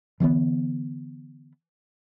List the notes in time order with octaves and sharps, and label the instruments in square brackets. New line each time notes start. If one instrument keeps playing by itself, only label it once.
[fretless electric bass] D3 E3 A3 B3